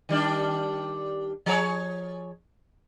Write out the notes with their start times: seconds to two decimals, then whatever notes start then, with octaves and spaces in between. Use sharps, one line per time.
0.09 D#3 G3 D4
1.46 F3 G#4 C#5